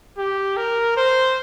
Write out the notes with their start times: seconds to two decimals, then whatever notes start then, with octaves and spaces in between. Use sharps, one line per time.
0.18 G4
0.57 A#4
0.97 C5